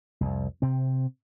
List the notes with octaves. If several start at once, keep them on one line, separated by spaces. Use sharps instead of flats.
C2 F2
C3 C4